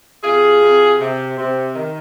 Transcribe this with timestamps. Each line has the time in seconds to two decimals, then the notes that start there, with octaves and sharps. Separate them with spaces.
0.23 C3 F4 G#4
0.61 C3
0.99 C3
1.37 C3
1.75 D#3